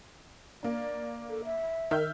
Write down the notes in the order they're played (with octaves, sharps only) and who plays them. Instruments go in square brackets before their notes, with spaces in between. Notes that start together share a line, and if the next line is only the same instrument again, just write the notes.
[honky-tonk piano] A#3 D4 [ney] D5
[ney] A4
E5
[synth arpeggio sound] D#3 [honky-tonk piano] E5 F6 G6